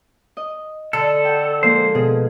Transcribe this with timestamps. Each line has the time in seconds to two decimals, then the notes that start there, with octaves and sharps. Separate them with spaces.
0.37 D#5
0.93 D3 A4
1.25 F#5 G5
1.63 F3 G#3 A#3 C5
1.95 B2 G#4